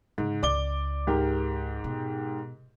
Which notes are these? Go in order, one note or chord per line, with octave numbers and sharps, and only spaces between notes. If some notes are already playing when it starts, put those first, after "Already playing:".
G#2 C#3
C#2 D5 D6 G7
G#2 G4 A#4
B2